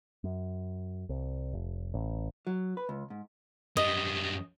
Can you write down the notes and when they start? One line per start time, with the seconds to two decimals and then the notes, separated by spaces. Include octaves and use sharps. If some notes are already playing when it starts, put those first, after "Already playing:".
0.24 F#2
1.09 C2
1.53 F1
1.94 A1
2.47 F#3
2.77 B4
2.89 C#2
3.10 G#2
3.77 F#2 G3 D#5